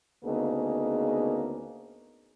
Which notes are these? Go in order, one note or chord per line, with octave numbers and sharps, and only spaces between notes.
D2 C#3 A#3 B3 D#4 G#4